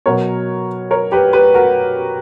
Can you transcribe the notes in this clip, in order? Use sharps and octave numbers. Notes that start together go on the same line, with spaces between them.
B2 F#3 B3 A#4 C#5
A#4 C#5
G4 B4
G4 B4
F#4 A#4